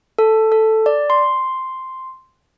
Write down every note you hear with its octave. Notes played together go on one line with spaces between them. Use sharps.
A4
A4
D5
C6